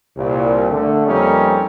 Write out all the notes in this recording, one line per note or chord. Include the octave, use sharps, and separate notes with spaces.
C2 A#2
D3 A3
F2 G3 A#3 C4 C#4 D#4